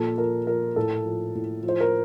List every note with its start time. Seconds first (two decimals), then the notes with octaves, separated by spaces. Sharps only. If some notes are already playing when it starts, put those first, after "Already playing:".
Already playing: A#2 F3 A4
0.18 F3 A#4
0.47 F3 A#4
0.76 A2 A4
1.05 F3
1.35 A2
1.63 F3
1.69 C5
1.80 A#4